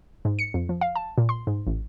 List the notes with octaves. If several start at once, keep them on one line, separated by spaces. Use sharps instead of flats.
G#2
C#7
F2
F3
F5
A5
A#2
C6
G#2
A1